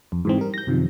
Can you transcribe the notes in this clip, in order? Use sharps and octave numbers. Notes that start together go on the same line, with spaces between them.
F2
G#2 E3 C4
G3 A#4
G6 A#6
F#2 C3 D#3 F3